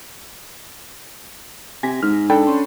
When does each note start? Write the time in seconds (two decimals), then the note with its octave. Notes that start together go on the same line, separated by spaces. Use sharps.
1.83 C3 G#5 A#6 B6
2.03 G#2 F6
2.30 D4 A4 G5 B5
2.47 C#4 C6